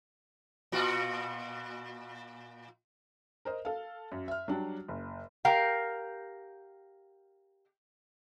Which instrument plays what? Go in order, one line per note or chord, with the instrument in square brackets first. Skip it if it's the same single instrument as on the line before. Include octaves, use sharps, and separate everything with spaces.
[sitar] A#2 F4 F#4
[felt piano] A#4 C5 D#5
A4 F5
F#2
E5 F6
F#3 G3 D4
F#1
[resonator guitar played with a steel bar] G4 A#4 F5 G5